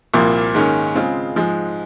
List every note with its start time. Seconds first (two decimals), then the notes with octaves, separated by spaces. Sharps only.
0.14 C2 A#2 F3 A#3
0.55 G#2 D#3 A#3 C#4
0.95 C#3 G#3 C4 F4
1.36 G#2 F3 G#3